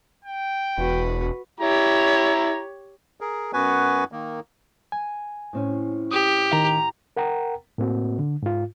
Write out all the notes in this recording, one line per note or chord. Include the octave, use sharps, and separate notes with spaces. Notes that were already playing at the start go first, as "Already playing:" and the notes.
G5
E1 F#4 B4
E4 G4 C#5 A#5
G#4 A#4
F#2 B3 F#4 B4 G#5
D#3 A#3
G#5
A2 C4 C#4
G4 D#6
D#3 A#5
A#4 F#5 G5 A#5
A2 A#3 C4 F#4
D3
G#2 F4